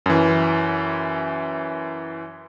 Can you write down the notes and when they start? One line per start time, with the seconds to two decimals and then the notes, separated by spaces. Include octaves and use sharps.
0.06 F#2 E3